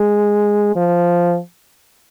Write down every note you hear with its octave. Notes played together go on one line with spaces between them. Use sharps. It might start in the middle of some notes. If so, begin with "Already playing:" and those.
Already playing: G#3
F3